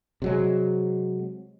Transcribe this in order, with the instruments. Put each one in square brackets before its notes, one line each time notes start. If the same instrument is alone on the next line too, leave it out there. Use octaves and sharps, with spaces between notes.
[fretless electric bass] C3 F#3 G#3